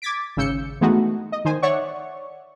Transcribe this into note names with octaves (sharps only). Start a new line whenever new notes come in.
D6 G#6 A6 B6 D7
G#1 C#3 E6 G6 C#7
E3 G#3 A3 B3 D#4 F#4
D#5
D#3 C5 G#5
C#5 D5 E5 F#5 C#6